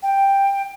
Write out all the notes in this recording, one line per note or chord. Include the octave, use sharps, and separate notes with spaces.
G5